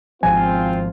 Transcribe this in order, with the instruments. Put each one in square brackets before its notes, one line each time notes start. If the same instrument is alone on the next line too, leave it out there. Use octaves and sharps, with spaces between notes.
[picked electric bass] G#1 F3 [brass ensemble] C4 F4 [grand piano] G#5